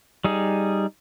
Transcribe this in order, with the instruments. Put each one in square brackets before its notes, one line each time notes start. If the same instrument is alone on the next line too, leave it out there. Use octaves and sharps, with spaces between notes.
[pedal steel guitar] G3 D#4 G#4